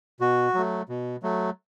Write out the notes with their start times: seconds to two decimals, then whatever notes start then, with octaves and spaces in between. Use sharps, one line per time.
0.20 B2 F#4
0.54 F#3 A3
0.89 B2
1.23 F#3 A3